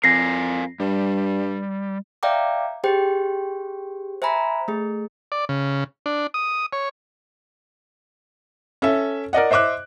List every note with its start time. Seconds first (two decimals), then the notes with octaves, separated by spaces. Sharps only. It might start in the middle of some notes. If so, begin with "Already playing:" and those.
0.04 F2 A#4 F5 G#5 A#6 C7
0.80 G2 G3
2.23 D5 E5 F5 G5 A#5 D6
2.84 G4 G#4 C5 G5
4.22 C5 E5 G#5 A#5 B5
4.68 A3 G#4
5.32 D5
5.49 C#3
6.06 D4
6.34 D#6
6.73 C#5
8.82 C#4 A4 E5
9.33 A#4 D5 D#5 F#5
9.51 C5 D#5 E5 D6 F#6